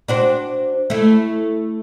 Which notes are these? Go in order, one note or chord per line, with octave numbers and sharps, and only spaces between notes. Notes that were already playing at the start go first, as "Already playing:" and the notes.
D4 F#4 C5
A3 E4